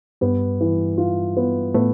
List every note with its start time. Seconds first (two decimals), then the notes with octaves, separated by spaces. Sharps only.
0.21 G2 G3 B3
0.60 E3
0.98 F4
1.37 B3
1.74 A2 A3 B3